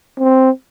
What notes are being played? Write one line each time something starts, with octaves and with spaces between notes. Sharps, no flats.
C4